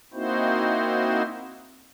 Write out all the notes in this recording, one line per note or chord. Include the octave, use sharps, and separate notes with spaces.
A#3 C4 D#4 E4 F#4 C5